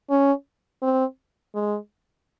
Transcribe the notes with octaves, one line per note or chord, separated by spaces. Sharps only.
C#4
C4
G#3